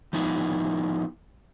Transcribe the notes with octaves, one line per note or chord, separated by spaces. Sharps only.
F3 B3 D#4 E4